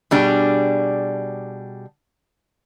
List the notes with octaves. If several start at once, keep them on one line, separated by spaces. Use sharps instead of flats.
B2 G3 D4 G#4